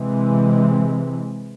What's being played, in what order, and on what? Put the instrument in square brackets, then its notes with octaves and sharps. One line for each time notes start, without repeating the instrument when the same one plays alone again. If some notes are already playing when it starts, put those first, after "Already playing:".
Already playing: [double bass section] C3 E3 G#3 C4